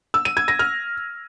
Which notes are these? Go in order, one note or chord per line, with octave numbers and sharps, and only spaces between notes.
E6
D#7
G#6
A#6
F6